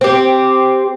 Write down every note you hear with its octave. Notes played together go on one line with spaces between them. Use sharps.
C4 G4